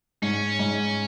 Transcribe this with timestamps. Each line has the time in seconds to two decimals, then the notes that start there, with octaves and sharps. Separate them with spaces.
0.22 G#2 C#4
0.59 G#2